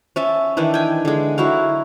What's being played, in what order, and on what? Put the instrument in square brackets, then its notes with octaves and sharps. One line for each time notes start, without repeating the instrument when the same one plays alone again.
[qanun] C#4 E5 A5
D#3 E3 D4 E4
G5 G#5
D3 G#3
F#3 E4 F#4 F5